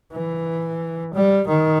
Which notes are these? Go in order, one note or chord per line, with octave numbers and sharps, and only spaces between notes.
E3
G3
D#3